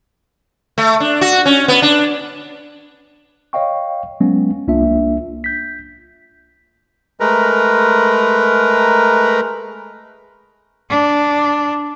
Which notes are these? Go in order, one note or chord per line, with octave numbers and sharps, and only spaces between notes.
A3
D4
F#4
C#4
B3
D4
C#5 D#5 F5 G5 C#6
F#3 G#3 B3 C#4
C2 A#3 D4 F4 E5
G6 B6
G#3 A3 A#4 B4 A#5
D4